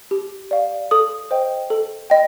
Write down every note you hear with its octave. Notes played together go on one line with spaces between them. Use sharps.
G4
D5 F5
A4 D#6
C5 D#5 G5
A4
D#5 G5